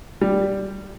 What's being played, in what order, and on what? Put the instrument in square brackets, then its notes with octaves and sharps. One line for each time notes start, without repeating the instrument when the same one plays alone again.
[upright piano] G3